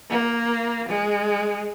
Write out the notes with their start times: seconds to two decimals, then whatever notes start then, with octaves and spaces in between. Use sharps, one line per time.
0.10 A#3
0.89 G#3